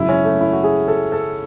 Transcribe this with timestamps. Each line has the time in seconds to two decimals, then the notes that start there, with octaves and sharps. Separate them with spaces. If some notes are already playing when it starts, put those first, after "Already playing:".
Already playing: G#1 F#2 C#3 F#3 E4
0.09 C#4
0.25 A3
0.41 E4
0.53 F#4
0.63 G#4
0.88 A4
1.12 A4